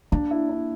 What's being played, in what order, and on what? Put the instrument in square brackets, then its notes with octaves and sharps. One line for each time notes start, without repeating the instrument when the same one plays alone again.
[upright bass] A#3 [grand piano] D4
[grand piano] E4
D4